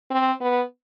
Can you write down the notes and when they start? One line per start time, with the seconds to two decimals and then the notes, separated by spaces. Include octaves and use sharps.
0.11 C4
0.41 B3